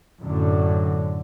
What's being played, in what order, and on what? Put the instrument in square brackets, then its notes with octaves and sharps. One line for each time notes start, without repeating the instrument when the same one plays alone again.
[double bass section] F#2 A2 D3